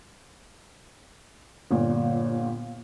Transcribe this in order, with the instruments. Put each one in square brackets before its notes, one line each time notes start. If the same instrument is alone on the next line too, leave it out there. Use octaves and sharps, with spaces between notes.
[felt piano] G1 A#2